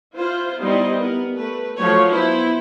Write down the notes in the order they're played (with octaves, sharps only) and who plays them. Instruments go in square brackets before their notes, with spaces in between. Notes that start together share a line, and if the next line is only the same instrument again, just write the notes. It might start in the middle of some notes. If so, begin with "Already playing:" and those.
[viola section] E4 F4 C5
G3 B3 D#4 E4 C5 D#5
B3 A#4
A3 B4
F3 F#3 A3 C#5
B3 E4 C5